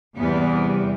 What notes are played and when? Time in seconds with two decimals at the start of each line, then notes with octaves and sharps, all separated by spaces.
0.16 E2 C3 G3 B3
0.64 G3